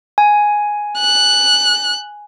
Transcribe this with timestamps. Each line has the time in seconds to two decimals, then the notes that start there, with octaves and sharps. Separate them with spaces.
0.18 G#5
1.00 F#6